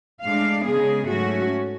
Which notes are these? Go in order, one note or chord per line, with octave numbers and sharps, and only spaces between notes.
A2 G#3 D4 F5
C#3 G#3 B3 G#4
G#2 F#3 A3 C#4 F#4